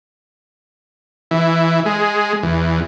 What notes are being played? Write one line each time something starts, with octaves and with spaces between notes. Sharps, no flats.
E3
G#3
E2